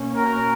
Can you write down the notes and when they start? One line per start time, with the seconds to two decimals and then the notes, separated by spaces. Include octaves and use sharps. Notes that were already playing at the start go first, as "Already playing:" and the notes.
Already playing: B2 A#3 C#4
0.15 F#4 A#4